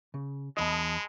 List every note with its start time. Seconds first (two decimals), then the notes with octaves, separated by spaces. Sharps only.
0.14 C#3
0.57 E2 G#3 D#5 A5 B5 D#6